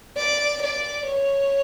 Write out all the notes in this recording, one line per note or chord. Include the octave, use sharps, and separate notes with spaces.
D5
D5
C#5